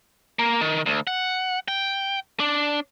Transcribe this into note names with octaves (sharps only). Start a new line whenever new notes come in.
A#3
D#3
D2
F#5
G5
D4